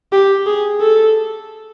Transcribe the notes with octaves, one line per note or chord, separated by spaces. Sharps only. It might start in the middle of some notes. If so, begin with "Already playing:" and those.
G4
G#4
A4